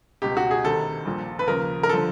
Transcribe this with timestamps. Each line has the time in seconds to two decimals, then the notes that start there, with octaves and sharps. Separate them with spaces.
0.22 C#2 B2 G4
0.37 F#4
0.51 G#4
0.64 D2 C3 D#3 A4
1.05 A#1 A#2 F3
1.39 B4
1.47 D#2 C#3 F3 A#4
1.83 A#4
1.89 D3 F3 A4